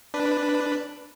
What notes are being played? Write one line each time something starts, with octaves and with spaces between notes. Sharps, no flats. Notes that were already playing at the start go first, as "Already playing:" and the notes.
D4 B4